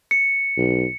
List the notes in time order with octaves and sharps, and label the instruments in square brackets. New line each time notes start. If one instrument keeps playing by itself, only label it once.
[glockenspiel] C#7
[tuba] B1